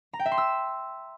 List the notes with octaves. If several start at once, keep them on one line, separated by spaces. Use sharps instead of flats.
A#5
G5
E5
C6
E6